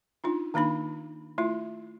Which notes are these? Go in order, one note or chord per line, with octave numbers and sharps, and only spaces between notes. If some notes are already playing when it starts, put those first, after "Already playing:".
D4 D#4 F4
D#3 A#3 D4 D#4 B5
A3 E4 F4